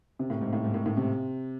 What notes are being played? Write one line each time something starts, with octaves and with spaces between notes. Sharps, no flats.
C3
A2
G#2
A2
G#2
A2
A2
C3